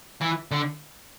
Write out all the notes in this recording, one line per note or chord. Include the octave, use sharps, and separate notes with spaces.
E3
D3